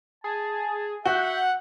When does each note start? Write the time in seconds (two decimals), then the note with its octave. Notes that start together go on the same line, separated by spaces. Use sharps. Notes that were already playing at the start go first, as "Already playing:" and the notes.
0.24 G#4 A5
1.05 F#4 E5 F#5 G6